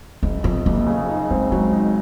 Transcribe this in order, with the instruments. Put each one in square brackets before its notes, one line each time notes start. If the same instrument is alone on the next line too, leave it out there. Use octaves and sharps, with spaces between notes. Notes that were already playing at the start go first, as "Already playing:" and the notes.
[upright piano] F#1 [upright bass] C#4
[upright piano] F2 [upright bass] C4
[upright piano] F#1 [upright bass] A#3
[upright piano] C#3
D#4
[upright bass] G#3 [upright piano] C4
[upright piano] F#3 [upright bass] G#3
[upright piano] D#4